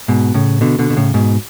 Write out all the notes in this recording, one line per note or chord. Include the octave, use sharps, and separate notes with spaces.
G#2 B2
A2 C#3
B2 D3
B2 D3
B2
A2 C#3
G#2 B2